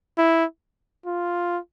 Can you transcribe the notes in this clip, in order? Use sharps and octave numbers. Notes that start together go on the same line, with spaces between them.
E4
F4